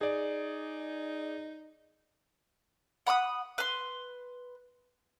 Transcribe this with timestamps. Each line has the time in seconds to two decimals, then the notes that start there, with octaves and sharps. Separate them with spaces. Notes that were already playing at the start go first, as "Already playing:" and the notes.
0.01 D#4 G#4 D5
3.07 F#5 B5 C#6 D#6
3.58 B4 C6